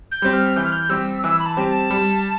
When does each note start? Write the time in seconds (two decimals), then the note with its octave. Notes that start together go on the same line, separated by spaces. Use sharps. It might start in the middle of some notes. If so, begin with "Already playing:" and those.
0.11 G6
0.22 G3 C4 G4
0.33 F6
0.56 E3 G6
0.64 F6
0.72 G6
0.89 G3 C4 G4 E6
1.23 E3 E6
1.39 B5
1.46 A5
1.57 G3 C4 G4
1.68 A5
1.91 G3